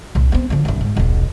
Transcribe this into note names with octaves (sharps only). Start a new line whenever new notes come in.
C2 A#2
B3 C4
D3 F3
C2 G2
G#2
D#1 B1